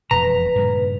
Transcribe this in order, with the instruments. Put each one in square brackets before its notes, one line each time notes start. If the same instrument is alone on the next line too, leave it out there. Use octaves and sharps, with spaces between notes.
[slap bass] E1 F2 B2 [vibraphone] B4 [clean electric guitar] A#5
[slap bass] G2 A#2 C#3